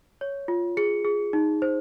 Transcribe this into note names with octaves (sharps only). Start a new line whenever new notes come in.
C#5
F4
G#4 C#7
G#4
D#4
C5